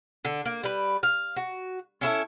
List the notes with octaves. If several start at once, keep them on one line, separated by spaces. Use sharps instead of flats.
D3
A#3
G3 B4
F5
F#4
C#4 E4 A4 E5